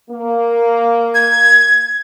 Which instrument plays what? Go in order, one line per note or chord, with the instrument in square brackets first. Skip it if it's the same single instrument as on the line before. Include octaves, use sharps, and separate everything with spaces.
[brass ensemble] A#3
[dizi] G#6